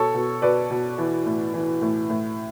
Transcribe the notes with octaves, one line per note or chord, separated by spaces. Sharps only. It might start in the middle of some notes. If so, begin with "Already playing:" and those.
Already playing: B2 A4 C#5
B2
B2 B4 D5
B2
E3
A2
E3
A2
A2